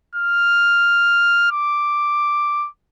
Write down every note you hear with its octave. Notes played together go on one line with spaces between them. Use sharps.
F6
D6